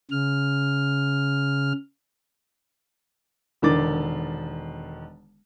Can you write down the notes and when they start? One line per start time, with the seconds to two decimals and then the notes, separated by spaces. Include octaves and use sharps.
0.11 C#3 F6
3.62 E1 D3 D#3 D6 A6